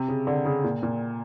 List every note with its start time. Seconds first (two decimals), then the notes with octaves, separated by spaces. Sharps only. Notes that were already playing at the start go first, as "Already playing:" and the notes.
Already playing: C3
0.08 C#3
0.27 D3
0.45 C#3
0.64 A#2
0.83 A#2